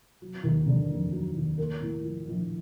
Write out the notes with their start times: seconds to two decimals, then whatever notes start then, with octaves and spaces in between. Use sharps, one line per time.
0.22 F#3
0.44 D#2
0.66 D3
0.90 F1
1.12 F#3
1.36 D#2
1.58 A#3
1.81 A2
2.03 F3
2.27 A#1